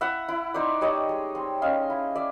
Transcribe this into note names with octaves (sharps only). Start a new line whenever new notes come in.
E4 E5 F#5
E4
D#4 C5 D5
G3 C#5 D#5
G#3
C4
C#4 D#5 F5
E4
D5 E5